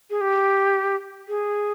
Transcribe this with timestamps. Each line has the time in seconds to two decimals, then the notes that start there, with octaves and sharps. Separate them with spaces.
0.10 G#4
0.21 G4
1.28 G#4